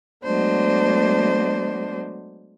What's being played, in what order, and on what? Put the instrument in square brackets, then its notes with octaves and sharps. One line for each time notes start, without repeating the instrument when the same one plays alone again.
[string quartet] F#3 G#3 A3 B3 D4 C5